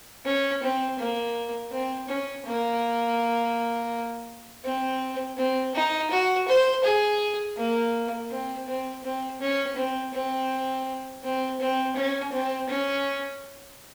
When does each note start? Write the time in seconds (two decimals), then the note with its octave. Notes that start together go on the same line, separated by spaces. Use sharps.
0.26 C#4
0.63 C4
0.99 A#3
1.72 C4
2.09 C#4
2.46 A#3
4.65 C4
5.37 C4
5.75 D#4
6.11 F#4
6.48 C5
6.84 G#4
7.57 A#3
8.31 C4
8.68 C4
9.04 C4
9.40 C#4
9.76 C4
10.13 C4
11.23 C4
11.60 C4
11.96 C#4
12.32 C4
12.69 C#4